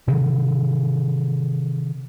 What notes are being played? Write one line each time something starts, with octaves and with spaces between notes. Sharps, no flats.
C3 D#3 E3